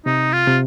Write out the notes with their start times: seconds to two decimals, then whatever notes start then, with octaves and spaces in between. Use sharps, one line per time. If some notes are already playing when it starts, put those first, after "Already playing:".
0.06 C3 D#4
0.33 F4
0.47 C3